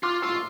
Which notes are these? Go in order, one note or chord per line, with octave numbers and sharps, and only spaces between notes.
F4 D6 F6
F4 C#6 E6